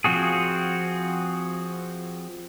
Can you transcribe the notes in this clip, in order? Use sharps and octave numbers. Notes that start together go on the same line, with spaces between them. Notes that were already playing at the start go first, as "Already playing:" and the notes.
F3 C4 F#4 G#4